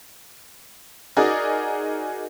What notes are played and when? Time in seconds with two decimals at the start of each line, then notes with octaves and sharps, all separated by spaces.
1.17 D#4 F#4 G#4 A#4 D5 D#6